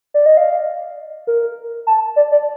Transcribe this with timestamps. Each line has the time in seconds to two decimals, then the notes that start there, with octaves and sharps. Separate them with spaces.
0.14 D5
0.26 D#5
0.37 F5
1.27 A#4
1.87 A5
2.16 D5
2.31 D5